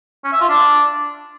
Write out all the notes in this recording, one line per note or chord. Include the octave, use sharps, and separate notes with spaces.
C#4
E5
F4
D4